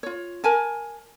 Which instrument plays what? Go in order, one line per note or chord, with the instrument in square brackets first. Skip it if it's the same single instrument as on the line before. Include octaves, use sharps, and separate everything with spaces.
[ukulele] F4 C#5
A#4 G#5 A5